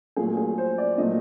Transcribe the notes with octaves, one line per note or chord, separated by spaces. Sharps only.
A#2 F#3 A3 G#4
G#4
C5
D5
A#2 F#3 A3 D#5